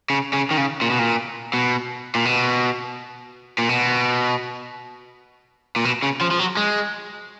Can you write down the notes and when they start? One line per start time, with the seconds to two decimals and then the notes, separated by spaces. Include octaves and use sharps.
0.10 C#3
0.33 C#3
0.51 D#3
0.58 C#3
0.82 A#2
0.90 B2
0.99 A#2
1.54 B2
2.15 A#2
2.25 B2
3.58 A#2
3.69 B2
5.76 A#2
5.85 B2
6.03 C#3
6.21 F3
6.31 F3
6.39 F#3
6.57 G#3